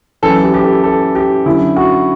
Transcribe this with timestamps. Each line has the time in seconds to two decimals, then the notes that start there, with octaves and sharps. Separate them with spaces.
0.22 F#2 E3 A4
0.43 G4
0.54 G4
0.64 A4
0.83 A4
1.15 G4
1.46 F#2 D3 E4
1.76 F#4